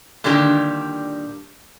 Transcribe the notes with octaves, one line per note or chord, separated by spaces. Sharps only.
A#2 D3 D#3 G3 D4 G4